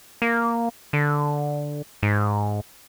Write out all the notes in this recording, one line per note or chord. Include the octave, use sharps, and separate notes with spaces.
A#3
D3
G#2